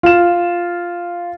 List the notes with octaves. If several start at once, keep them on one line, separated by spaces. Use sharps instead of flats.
F4 E7